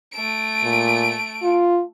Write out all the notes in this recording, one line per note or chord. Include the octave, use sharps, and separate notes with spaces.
A3 D7
A#2
F4